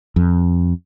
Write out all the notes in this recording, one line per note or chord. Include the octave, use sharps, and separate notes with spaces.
F2